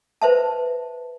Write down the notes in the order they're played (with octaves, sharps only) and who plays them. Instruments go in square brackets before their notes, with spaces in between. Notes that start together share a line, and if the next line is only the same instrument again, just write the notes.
[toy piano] B4 C5 E5 A5